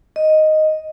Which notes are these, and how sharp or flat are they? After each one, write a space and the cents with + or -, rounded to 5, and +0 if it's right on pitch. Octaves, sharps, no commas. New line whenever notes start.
D#5 +0